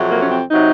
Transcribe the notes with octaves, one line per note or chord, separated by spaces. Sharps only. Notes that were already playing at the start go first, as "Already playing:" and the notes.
Already playing: F2 C3 F#3
A#3
C#4
C4
C3 F#3 D#4